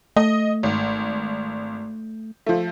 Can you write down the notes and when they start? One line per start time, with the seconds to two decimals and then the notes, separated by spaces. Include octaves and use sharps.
0.16 A3 D#5
0.63 G#1
2.46 F3 A3